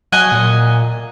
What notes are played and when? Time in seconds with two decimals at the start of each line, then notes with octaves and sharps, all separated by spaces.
0.12 F#3 D#5 F#5 G#5
0.32 A#2